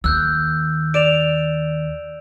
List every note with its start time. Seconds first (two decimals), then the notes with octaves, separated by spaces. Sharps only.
0.04 D#2 E6 F#6 G6
0.94 D5 D7 E7 F7